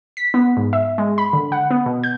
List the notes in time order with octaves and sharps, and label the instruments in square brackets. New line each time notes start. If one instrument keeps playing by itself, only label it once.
[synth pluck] B6
B3
G#2
E5
G#3
B5
D3
F#5
B3
B2
G6